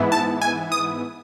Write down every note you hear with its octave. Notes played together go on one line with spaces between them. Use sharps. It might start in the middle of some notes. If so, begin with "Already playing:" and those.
Already playing: G#2 E3 B3 E4
A5
G#5
D#6